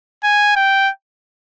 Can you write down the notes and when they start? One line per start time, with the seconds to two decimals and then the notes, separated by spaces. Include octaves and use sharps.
0.24 G#5
0.56 G5